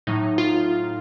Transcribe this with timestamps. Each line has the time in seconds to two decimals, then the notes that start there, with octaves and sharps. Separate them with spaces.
0.07 A2 F#3 D#4
0.38 F4